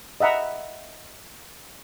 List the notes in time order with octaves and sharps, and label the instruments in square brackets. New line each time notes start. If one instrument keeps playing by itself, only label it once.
[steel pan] D#5 E5 F#5 A#5 B5